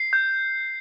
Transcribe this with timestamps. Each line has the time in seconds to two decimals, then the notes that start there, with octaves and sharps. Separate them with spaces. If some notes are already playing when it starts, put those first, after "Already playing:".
Already playing: C7
0.13 G6